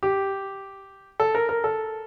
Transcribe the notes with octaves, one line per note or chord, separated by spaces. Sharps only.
G4
A4
A#4
A#4
A4